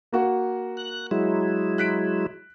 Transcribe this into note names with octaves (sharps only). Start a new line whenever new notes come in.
A#3 F#4 F#5
F#6
F#3 G#3 E4
F#6 B6 D7